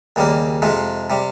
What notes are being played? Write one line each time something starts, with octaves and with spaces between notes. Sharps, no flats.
D#2 C#3 G3 A#3
F2 C3 F3 G#3
C3 G3